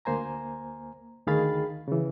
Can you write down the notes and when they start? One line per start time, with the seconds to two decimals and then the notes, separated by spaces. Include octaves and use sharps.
0.05 D2 A#3 C5 G#5 A#5
1.27 D2 D#3 G#4 F5 B5 A6
1.88 C#3 E3